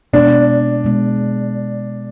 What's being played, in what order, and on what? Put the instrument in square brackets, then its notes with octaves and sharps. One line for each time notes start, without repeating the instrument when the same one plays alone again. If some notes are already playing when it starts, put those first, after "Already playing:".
[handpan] B2 G#3 B3 [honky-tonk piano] D4
[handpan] B2 G#3 B3